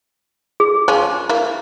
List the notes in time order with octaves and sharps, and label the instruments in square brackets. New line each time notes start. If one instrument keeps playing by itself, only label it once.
[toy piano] G#4
[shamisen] F3 C#4 [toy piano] C5
[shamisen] A#3 E4